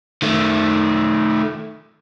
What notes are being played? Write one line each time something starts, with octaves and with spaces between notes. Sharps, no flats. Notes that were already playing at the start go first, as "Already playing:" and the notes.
D#3 A3